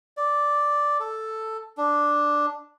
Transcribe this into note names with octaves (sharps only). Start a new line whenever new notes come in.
D5
A4
D4